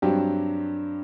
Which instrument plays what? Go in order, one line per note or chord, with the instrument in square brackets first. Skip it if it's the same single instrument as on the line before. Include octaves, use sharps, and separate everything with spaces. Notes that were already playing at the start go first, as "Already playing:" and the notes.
[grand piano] G2 F#3 C4 G4 [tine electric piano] D4